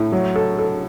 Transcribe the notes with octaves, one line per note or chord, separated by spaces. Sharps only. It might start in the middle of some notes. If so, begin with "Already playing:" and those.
Already playing: A2
F#3
A4
A4